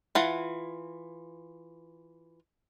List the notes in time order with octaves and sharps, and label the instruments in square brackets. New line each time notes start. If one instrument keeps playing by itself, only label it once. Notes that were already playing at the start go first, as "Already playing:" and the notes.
[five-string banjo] E3 F4 F#5